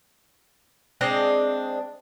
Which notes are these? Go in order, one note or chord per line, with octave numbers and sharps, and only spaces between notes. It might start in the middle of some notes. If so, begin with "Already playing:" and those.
G#3 C4 D4 D#5